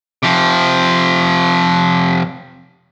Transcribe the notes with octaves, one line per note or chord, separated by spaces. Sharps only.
C3 F3